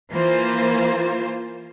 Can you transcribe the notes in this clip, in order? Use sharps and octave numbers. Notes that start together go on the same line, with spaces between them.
E3 A#3 F4 C5